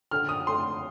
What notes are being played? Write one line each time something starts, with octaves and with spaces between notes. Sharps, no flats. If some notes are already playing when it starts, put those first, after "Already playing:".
D3 F6
D#6
A3 C6